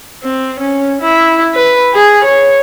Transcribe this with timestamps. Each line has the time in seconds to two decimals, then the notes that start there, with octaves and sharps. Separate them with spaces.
0.23 C4
0.60 C#4
1.02 E4
1.55 B4
1.94 G#4
2.24 C#5